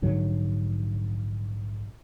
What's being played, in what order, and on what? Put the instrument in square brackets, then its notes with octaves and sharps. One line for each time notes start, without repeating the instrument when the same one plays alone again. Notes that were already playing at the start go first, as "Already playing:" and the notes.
[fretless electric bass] A#1 G#2 D3 F#3